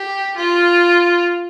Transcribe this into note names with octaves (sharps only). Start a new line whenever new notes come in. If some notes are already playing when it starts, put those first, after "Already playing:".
Already playing: G4
F4